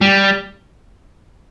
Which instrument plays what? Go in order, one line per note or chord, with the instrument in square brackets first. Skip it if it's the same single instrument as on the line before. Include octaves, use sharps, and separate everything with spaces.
[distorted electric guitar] G3